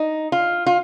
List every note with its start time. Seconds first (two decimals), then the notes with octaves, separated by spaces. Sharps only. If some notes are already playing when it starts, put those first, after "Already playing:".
Already playing: D#4
0.32 F4
0.66 F4